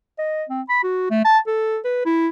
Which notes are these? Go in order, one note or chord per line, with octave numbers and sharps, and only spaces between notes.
D#5
C4
B5
F#4
A3
A5
A4
B4
E4